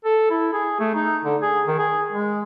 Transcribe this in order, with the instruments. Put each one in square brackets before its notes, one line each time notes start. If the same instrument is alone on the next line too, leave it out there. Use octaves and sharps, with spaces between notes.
[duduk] A4
E4
G#4
A3
D#4
D3
G#4
D#3
G#4
G#3